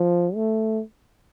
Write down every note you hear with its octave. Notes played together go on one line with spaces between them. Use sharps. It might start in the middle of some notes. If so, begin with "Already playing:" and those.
Already playing: F3
A3